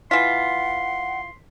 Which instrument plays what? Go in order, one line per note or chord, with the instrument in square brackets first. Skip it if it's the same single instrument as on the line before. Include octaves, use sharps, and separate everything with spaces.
[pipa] E3 F4 [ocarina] F#5 [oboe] C6 [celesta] B6